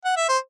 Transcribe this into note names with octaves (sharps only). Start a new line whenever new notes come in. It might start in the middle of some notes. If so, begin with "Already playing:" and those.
F#5
E5
C5